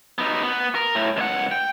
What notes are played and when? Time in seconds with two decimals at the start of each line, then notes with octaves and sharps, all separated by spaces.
0.18 B3 D#4
0.43 B3
0.75 A#4
0.95 A2
1.17 C#2 F#5
1.51 G5